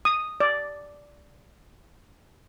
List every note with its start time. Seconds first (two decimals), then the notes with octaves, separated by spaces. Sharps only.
0.05 D#6
0.40 D5